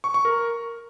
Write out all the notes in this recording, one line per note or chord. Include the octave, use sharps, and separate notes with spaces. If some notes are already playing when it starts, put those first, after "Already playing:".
C#6
C#6
A#4